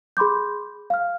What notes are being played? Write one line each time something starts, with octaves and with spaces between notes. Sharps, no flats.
G#4 B5 C6 D6 G6
F5 F6